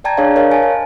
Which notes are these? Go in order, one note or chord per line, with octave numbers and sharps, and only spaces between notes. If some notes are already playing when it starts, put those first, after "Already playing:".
D5 G5 A5 A#5 G#6
D4 G#4 C#5 D5 F5
A#4 C#5 D#5 F5
G#5 A5
C5